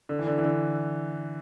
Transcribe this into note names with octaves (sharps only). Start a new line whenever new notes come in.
D3
E3
D3
E3
D3